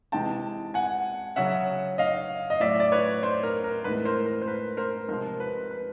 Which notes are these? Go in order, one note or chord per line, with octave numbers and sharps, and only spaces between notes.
C3 E3 G#3 G5 A5
F#5 G#5
C#3 F#3 E5 F#5
D#5 F5
D#5
A2 F#3 D5 E5
D5
B4 C#5
C5 D5
A#4
A#4
A2 E3 G#3 B4
A#4 C5
A#4
C5
B4
A#4 C5
C3 F3 G#3 A#4 C5
B4
B4